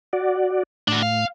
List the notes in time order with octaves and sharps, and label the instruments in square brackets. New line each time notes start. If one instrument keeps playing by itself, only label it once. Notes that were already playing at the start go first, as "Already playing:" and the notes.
[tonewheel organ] F#4 D5
[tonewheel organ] A2 [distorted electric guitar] D4 F#4
[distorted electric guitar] F5